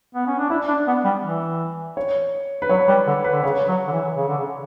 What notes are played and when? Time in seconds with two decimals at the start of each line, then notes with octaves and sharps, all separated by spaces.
0.15 B3
0.27 C#4
0.39 D4
0.50 E4 D5
0.68 D4
0.87 B3
1.05 G3
1.24 E3
1.97 C#5
2.62 B4
2.69 F#3 C#5
2.88 G3 B4
3.07 D3
3.24 B4
3.32 D3
3.43 C#3 C#5
3.68 F#3
3.88 D3
3.93 E3
4.16 C#3
4.28 D3
4.38 C#3